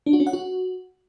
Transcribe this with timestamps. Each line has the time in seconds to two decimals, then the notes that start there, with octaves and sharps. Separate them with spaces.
0.06 D4
0.13 F#4
0.20 C#4
0.27 F#5
0.33 F#4